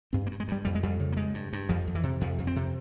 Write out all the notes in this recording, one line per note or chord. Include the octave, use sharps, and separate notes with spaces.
G2 C4
A#3
G2
G#3
G2 G3
F2 G3
G#3
F2 G3
C#3
A#3
G2 G#3
G2
G2
F2 F3
F2
E3
C3
F2 F3
F2
C4
C3